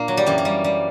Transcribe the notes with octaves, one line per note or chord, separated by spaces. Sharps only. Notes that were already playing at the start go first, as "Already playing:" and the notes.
Already playing: A#2 A#3 D4
F#3
G3
F#2 E3 A#3
A#3
G3
G3